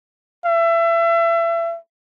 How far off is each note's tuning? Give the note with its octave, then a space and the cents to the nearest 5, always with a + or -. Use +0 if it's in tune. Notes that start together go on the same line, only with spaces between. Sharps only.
E5 +30